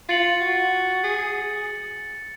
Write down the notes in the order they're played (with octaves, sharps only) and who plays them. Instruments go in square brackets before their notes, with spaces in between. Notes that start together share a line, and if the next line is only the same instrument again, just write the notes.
[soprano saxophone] F4 [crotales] A6 C#7 F#7
[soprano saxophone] F#4
G#4